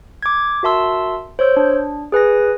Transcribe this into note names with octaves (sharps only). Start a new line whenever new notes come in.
D6 G#6
F#4 A#4 E5 A5 C6 E6
C5 C#5 E6 G6
D4
G#4 B4 G#5 A#6